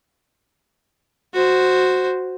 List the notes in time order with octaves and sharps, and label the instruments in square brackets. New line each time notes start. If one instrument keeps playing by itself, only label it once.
[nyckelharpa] F#4 C5